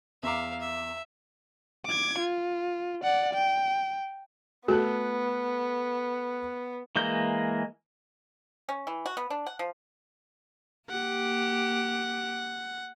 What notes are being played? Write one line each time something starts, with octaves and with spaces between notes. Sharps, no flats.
E2 E5 F5 A#5 D6
E5
D6 G#6
F4
D5 F#5
G5
A3 B3 F#4 A4 F#6
E3 G#3 A#3 G6
C#4
E3
F#4
B3
D4
F#5
F3
A#3 G4 F#5